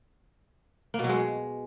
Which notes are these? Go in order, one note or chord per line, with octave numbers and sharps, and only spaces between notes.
A#3
B2
F#3
G#3